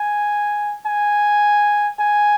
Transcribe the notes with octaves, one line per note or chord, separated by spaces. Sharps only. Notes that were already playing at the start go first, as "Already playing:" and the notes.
Already playing: G#5
G#5
G#5